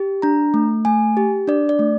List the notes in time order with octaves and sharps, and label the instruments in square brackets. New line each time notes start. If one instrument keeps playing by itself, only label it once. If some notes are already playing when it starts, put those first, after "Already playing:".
Already playing: [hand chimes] G4
D4 A#5
A3
A3 G#5
G4
D4 D5
D5
A3